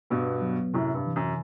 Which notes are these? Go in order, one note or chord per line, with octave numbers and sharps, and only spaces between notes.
G2 B2 B3
F#3
F#2 A2 C3
G2
E3
F#2